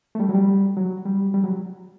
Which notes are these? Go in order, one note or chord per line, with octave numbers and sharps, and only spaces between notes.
A3
G3
F#3
G3
F#3
G3
G3
F#3